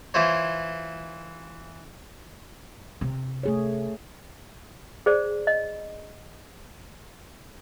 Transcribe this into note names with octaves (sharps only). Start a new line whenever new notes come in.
E3 E4 F4 C5 C#5
C3
A3 G#4 C#5
G#4 C5 D5
D#5